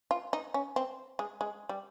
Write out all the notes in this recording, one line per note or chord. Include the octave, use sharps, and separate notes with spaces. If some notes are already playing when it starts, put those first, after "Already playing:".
F4
D#4
C#4
C4
G#3
G#3
G3